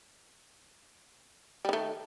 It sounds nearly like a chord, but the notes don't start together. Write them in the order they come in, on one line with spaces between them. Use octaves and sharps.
G3 D#3 A3